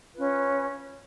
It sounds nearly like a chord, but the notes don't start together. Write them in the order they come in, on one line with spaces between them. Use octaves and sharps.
B4 F4 C#4